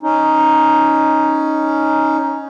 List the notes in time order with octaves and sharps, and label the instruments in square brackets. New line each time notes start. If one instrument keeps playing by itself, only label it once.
[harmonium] C#4 D#4